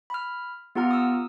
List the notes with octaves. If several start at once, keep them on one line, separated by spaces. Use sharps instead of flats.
B5 F6
B3 F4 G4 F#5 A#5 F6
D#6 E6